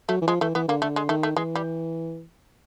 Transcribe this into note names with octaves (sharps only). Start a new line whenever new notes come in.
F#3 A3
E3
F3 G#3
E3 A3
E3 B3
D3 A#3
D3 A3
G#3
D#3 A3
A3
E3 G#3
G3